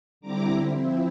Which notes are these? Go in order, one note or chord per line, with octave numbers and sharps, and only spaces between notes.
D3 G3 C4 E4 A#5 D6
F3 C4 E4